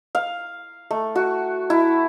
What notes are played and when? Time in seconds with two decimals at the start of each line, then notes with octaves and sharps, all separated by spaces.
0.15 F5
0.91 A3
1.15 F#4
1.70 E4